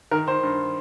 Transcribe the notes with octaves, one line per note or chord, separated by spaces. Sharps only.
D#3 A#4
D#3 C5
G2